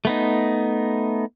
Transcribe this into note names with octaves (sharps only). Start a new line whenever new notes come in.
A3 B3 D#4